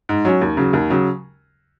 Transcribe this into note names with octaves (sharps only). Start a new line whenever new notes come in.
G#2
F#3 C#4
D#2
C#3 F#3
D#2
C#3 F#3